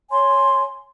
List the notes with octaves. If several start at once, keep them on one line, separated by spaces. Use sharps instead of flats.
C#5 G#5 C6